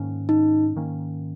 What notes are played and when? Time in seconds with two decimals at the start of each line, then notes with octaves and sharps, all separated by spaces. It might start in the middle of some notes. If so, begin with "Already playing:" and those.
Already playing: G#2 D#3 A#3 C#4
0.29 D#4
0.76 G#2 D#3 A#3 C#4